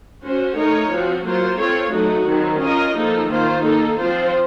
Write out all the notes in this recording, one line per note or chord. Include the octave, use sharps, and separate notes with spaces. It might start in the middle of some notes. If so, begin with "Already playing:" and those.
C#4 F#4 C5
A3 D#4 A#4 C#5
F3 C4 F#4
F#3 A#3 F4 C5
C4 F4 A4 C#5
F#3 A3 D#4 F#4
D#3 F#3 C4
C#4 F4 A#4 D#5
F3 A#3 D#4 A4
D#3 A#3 F4 C5
A#3 D#4 A4
F3 C4 F4 C5